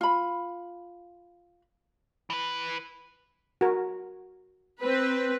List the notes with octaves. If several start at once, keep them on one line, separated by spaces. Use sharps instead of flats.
F4 B5
E3 B4
F#4 A#4
C4 B4